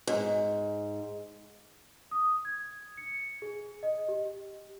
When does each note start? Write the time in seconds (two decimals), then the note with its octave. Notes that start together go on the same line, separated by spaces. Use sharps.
0.07 G#2
2.11 D#6
2.45 G#6
2.97 C#7
3.42 G#4
3.83 D#5
4.09 G4